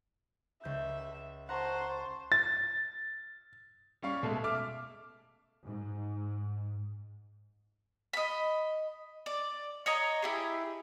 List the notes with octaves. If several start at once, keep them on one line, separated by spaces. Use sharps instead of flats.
C#2 E5 G6
C5 F#5 A5 A#5 C#6
A6
G3 C#4 F5 C#6
B2 G#3 A3 A4
E5 D6 F6
G#2
D#5 B5
D5
C#5 D#5 A#5
E4 G4 G#4